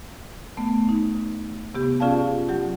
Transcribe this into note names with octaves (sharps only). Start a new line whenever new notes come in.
A3 B3
D#4
C3 B3 G4
C#4 F4 G#4 D5 F5 A5
F#3 G4